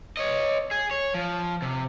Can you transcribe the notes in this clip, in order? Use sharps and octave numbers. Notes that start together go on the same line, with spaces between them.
C#5 D#5
G#4
C#5
F3
C3